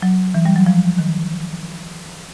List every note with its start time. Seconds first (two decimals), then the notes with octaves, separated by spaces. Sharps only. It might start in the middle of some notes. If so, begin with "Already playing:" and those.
0.02 F#3
0.34 E3
0.45 G3
0.56 F#3
0.66 F3
0.98 D#3